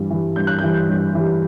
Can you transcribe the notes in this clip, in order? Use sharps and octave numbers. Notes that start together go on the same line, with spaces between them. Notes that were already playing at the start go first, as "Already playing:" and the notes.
Already playing: G2 E3 G3
E3 G3
G2 G6
F#6
E3 G3 G6
G2
E3 G3